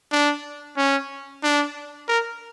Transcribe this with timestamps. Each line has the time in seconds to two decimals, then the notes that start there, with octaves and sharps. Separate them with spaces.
0.12 D4
0.77 C#4
1.43 D4
2.08 A#4